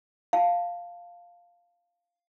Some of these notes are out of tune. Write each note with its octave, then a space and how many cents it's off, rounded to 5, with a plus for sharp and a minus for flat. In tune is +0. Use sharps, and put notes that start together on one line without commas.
F5 +0 A5 +10